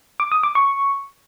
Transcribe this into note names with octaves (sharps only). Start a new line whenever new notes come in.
D6
D#6
D6
C#6